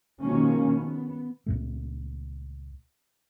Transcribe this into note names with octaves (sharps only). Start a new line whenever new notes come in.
B2 D#3 F3 G#3 A#3 C#4
B3
C#2 A#2 A3